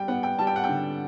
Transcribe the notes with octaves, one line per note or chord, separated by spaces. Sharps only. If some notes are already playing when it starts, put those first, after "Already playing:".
Already playing: G3 G5
B3 F#5
G5
G3 A5
G5
F#5
G5
D3